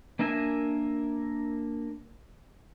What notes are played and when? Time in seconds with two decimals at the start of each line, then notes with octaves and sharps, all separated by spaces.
0.19 A#3 D4 A#4 E5 G#5